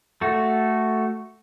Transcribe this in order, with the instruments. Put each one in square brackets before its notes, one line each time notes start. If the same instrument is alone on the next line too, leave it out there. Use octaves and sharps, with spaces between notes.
[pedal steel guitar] A3 F#4 A4